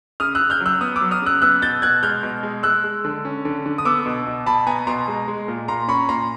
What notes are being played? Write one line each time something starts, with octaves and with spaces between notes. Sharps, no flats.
C#3 D#6 F6
E6 F#6
C#3
F6 G6
F#3
E6 F#6
B3 D#6 F6
D6 E6
F#3
D#6 F6
C#3 E6 F#6
B3 E6 F#6
B2 G6 A6
B2 F#6 G#6
G#3 F6 G6
B2
G#3
G#3 E6 F#6
G#3
D3
C#4
D3
D3
D#6
B3 D6 E6
B2
B2
B2 A5 B5
B3 G#5 A#5
B2 A#5 C6
G#3
G#3
A#2
A#2 A#5 C6
C#4 B5 C#6
A#2 A#5 C6